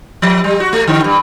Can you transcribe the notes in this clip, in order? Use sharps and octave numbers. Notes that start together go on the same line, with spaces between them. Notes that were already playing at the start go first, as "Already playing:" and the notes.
F3
G3
F#4
A3
D3
G2